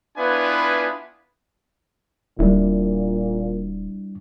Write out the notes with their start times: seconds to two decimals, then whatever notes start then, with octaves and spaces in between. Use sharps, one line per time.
0.17 B3 D4 E4 F4 B4 G#5
2.39 D#1 A#2 G3 D4 E4